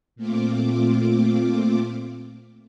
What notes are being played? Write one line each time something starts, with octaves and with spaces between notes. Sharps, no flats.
A#2 A3 C4 F4 D6